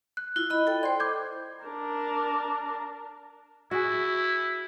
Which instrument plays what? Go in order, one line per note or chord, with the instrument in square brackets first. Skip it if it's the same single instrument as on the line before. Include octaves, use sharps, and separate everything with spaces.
[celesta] F#6
[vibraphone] E4 F4 [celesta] F#6
[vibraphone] E4 D#5 B5
A4 G5
[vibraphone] C5 C6 [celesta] D5 G5
[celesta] D6 G6 G#6
[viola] D4 A#4
[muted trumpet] E4 [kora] F#4 G#4